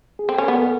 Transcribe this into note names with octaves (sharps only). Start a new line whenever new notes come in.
G#4
C4 A4
C#4
B3 A#4
A4